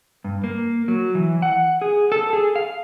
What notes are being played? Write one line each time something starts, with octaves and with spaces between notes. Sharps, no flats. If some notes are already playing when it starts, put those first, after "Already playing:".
G2
A#3
F#3
E3
F#5
G#4
A4
G#4
F5